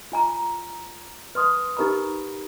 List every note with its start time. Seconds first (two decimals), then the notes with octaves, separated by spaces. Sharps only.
0.12 F4 G#5 A#5
1.35 B4 C6 D#6
1.77 D#4 G4 A#4 B4 A#5 B5